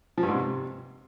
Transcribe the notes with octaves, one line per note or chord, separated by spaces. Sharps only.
F3
G2
G#2
C3